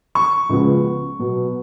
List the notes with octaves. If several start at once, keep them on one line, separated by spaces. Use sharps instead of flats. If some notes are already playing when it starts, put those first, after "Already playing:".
C#6
C#2 C#3 F3 G#3 B3
B2 F#3 B3